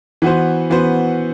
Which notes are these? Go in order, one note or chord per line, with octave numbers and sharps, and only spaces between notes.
E3 B3 F#4 C5
E3 B3 F#4 C5